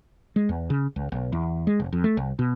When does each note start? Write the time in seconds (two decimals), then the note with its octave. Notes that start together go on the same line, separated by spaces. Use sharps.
0.36 G#3
0.49 E2
0.70 C#3
0.96 C#2
1.12 B1
1.32 E2
1.67 G#3
1.80 F1
1.93 F2
2.04 A3
2.17 C2
2.39 B2